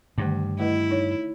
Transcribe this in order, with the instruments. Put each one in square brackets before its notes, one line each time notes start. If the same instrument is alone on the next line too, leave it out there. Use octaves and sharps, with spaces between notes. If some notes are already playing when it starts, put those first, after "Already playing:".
[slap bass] G2 [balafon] D3 D#3 A3
[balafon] A3 B4 D#5 [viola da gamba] E4
[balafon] D#4 C#5